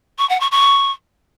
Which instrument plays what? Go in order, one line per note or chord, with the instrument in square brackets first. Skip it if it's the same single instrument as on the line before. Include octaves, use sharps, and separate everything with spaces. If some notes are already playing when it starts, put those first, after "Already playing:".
[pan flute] C#6
F#5
C#6
C#6